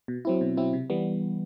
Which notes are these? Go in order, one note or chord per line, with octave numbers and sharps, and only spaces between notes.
B2
F#3 C4 E4
B2
F#3 C4 E4
C3
E3 G3 B3